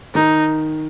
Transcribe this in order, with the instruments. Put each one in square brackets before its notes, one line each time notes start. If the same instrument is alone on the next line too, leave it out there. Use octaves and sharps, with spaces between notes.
[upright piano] D#3 [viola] D#4